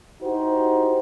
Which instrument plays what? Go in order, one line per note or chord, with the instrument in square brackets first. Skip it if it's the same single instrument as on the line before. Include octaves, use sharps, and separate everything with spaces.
[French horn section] D#4 E4 F#4 G4 C5